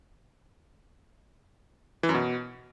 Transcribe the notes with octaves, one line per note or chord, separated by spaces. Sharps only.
E3
F#2
B2